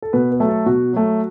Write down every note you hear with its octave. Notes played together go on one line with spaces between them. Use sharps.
A4
B2 B4
B4
F#3 A3
A4
B2 F#4
F#3 A3